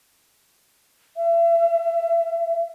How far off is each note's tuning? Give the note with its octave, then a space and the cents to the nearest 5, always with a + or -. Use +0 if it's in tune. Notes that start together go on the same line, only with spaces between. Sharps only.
E5 +40